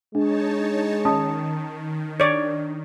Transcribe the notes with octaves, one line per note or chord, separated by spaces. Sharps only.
G#3 D4 D#4 C#5 A5
D#3 C#4 A5 D#6
D4 C#5 D5